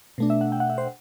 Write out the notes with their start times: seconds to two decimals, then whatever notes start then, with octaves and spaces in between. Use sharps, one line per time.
0.18 B2 A3 D4
0.30 E5
0.41 F#5
0.52 G5
0.60 F#5
0.70 E5
0.78 C5